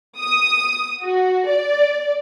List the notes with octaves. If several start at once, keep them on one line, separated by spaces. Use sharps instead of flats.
D#6
F#4
D5